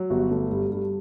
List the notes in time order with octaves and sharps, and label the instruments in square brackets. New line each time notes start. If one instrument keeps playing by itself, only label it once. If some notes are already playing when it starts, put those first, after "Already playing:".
Already playing: [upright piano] F#3
G1 F#4
A3
G2
G2